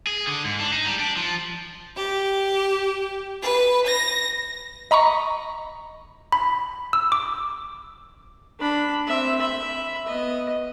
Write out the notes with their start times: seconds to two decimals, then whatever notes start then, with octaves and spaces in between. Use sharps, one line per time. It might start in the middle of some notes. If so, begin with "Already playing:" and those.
0.07 G#4
0.27 D3
0.44 G#2
0.60 D4
0.72 D#4
0.85 G3
0.99 D4
1.16 F3
1.97 G4
3.42 B4
3.86 A#6
4.91 D#5 A#5 B5 C#6
6.32 B5
6.93 E6
7.12 D6
8.59 D4 B5
9.07 C4 E5
9.40 E5 B5
10.06 B3 D#5